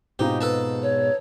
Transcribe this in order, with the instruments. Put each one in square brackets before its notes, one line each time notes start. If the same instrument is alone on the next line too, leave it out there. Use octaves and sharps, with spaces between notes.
[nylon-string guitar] G#2 B2 G#3 [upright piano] C4 D#4 F4 [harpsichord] G4
[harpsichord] A4 B4 A5
[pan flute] C#5